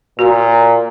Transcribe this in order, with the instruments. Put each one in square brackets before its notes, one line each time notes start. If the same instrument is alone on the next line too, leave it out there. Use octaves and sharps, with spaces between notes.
[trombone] A#2 [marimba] F#4